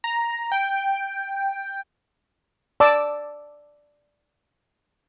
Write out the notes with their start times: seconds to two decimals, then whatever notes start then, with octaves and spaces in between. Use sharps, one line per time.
0.04 A#5
0.52 G5
2.80 D5 A5 D6 E6